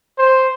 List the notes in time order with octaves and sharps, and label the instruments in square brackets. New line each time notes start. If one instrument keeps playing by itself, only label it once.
[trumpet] C5